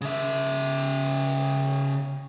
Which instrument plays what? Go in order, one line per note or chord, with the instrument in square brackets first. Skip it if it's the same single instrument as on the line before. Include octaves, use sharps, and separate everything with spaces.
[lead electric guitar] C#3 E5